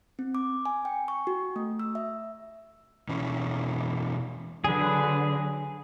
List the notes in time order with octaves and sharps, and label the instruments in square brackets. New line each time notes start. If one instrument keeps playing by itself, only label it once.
[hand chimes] C4
D6
G#5
G5
C#6
F#4
A3
E6
E5
[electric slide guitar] B2 E3 C#4
[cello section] D3 F#3 [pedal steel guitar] G#4 B4